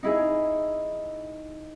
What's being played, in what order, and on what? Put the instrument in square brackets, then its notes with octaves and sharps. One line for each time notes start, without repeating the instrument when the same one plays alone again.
[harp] D#4 E4 G#4